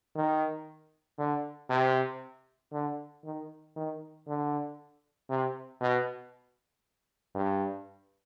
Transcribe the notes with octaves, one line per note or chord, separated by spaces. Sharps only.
D#3
D3
C3
D3
D#3
D#3
D3
C3
B2
G2